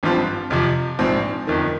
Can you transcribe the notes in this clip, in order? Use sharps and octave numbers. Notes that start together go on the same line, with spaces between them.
G#1 G2 F3 C4 F4
F2 C3 F3
A#1 G#2 F3 C4
G1 F2 D#3